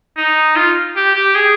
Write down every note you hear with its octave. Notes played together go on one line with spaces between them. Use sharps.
D#4
F4
G4
G4
G#4